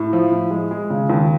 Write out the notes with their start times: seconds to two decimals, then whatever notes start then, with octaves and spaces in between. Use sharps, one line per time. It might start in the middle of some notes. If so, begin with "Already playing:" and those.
Already playing: A2
0.13 F3
0.31 A2
0.51 G#3
0.71 G#3
0.90 C#3
1.10 D#2